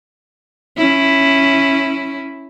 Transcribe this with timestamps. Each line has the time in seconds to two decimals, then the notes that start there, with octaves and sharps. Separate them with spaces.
0.77 C#4 E4